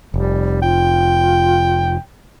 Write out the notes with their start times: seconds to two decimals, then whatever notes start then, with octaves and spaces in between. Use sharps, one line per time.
0.14 F1 G3
0.62 F4 G5